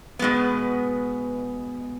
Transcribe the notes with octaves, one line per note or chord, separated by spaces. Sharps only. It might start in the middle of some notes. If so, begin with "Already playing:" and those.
B2 G#3 B3